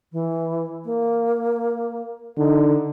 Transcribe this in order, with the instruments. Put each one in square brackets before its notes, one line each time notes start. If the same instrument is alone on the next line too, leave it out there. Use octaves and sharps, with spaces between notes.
[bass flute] E3
A#3
[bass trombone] D3 [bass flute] D#4